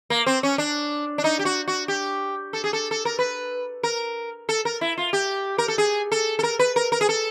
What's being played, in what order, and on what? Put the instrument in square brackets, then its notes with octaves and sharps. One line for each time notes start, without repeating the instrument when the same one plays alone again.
[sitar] A#3
C4
C#4
D4
D4
D#4
G4
F#4
F#4
G4
A4
G#4
A4
A4
A#4
B4
A#4
A4
A#4
E4
F4
G4
A#4
A4
G#4
A4
A4
A#4
B4
A#4
A#4
G#4
A4